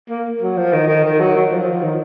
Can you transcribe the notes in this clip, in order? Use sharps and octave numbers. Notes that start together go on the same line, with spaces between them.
A#3
F#3
F3
D#3
D#3
D#3
F#3
F#3
F3
F3
F3
D#3